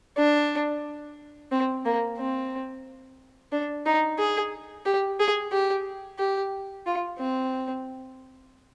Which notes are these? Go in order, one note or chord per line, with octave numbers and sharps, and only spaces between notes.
D4
C4
A#3
C4
D4
D#4
G#4
G4
G#4
G4
G4
F4
C4